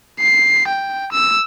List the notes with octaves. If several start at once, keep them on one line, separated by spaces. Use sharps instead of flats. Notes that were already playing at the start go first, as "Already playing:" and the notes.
C7
G5
E6